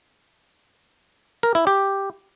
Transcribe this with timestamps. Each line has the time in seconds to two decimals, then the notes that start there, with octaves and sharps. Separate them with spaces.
1.43 A#4
1.55 E4
1.67 G4